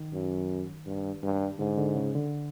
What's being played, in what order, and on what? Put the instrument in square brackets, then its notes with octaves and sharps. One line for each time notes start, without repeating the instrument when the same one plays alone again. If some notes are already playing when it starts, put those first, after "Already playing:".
Already playing: [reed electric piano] D#3
[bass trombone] F#2
G2
G2
[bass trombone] G#2 [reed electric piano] D3
[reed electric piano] D3
C#3
D3